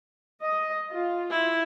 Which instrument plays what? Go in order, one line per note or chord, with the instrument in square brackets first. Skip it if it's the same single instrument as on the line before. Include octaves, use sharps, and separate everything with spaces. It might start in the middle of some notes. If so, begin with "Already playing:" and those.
[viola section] D#5
F4
[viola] E4